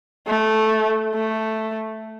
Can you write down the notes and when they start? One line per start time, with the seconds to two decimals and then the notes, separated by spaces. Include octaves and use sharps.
0.27 A3
1.14 A3